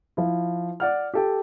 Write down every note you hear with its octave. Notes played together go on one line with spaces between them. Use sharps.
F3 E4
D5 F#5 F6
G4 A4 G5